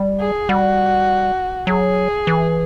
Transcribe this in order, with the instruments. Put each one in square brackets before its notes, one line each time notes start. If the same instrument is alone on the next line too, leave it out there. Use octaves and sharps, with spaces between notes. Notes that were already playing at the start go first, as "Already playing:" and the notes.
Already playing: [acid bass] G3
[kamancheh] G#4
[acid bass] G3 [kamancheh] F#4
[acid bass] F#3 [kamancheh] G#4
[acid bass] E3